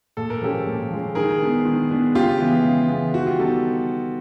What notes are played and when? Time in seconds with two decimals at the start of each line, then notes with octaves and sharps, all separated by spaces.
0.17 A#2 A4
0.30 A#4
0.42 F3 G#3 C#4 G4 A4
0.67 A#2
0.90 F3 G#3 C#4
1.15 D#3 G#4 A#4
1.41 G#3 B3 D4
1.65 D#3
1.90 G#3 B3 D4
2.15 C#3 F4 G4
2.40 E3 G#3 B3
2.64 C#3
2.89 E3 G#3 B3
3.14 D#3 F#4
3.26 F4 G4
3.39 G3 B3 D#4 G4 A4